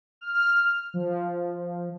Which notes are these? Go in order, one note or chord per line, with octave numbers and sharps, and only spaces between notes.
F6
F3